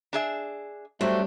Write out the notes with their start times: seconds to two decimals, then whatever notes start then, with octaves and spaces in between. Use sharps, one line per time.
0.13 D4 G#4 E5
1.01 F#3 G3 A3 C4 D4